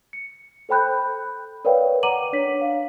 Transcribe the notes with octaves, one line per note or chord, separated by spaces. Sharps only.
C#7
A4 C5 G5 B5 F#6 G6
A#4 B4 C#5 D5 F5 G5
F#5 A#5 D6 D#7 F#7
D4 C#5 B6
F5